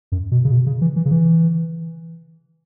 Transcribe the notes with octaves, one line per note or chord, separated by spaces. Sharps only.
F#2
B2
C#3
B2
C#3
E3
E3
C#3
E3